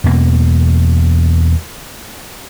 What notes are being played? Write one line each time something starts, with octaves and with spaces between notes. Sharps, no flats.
E2 B2 A#3